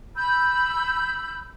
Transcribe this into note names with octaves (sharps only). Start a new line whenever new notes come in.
B5 E6 G6